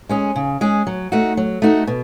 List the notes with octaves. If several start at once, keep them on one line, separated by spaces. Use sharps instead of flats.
G#3 C#4 G#4
C#3
G#3 C#4 G#4
F#3
A3 D#4 F#4
F#3
A3 D#4 F#4
B2